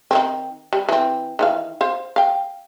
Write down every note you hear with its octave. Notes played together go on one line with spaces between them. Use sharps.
D#3 E3 C4
G3
E3 C4
D#3 E3 F5
C5 F5
F5 G5